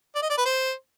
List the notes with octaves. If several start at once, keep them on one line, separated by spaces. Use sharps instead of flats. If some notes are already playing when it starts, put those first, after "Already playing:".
D5
D#5
D5
B4
C5